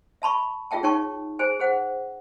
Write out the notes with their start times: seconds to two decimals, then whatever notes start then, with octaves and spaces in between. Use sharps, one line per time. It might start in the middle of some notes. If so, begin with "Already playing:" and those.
0.22 E5 A5 B5 C#6
0.71 F4 G#4 E5 G5 A5
0.83 D#4 C#5 G5 A5 C#6
1.39 G#4 C5 G#5
1.59 G#4 C5 F#5